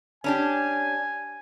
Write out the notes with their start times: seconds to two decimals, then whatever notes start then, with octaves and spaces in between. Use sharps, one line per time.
0.24 C#4 D4 G4 G#5